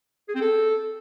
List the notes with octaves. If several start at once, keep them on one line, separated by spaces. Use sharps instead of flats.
G#4
C4
A4